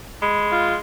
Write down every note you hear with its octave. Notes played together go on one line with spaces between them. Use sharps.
G#3 B5
F4